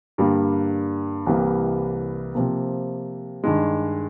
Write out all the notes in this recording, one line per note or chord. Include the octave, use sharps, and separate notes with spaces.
G2 D3 G3 A#3
C2 C3 E3 G3 A#3
C3 F3 A#3
G2 D#3 G#3